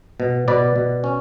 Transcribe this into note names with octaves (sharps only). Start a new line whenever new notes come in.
B2
B2 B4 D5
B2
C#4